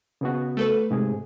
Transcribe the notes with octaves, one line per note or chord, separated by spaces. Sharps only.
C#3 B3 F#4
A3 A4 B4
G#2 C3 G#4